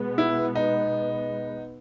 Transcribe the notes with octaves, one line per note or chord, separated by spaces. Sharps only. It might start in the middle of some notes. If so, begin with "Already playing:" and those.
Already playing: B2 G#3 B3
E4
D#4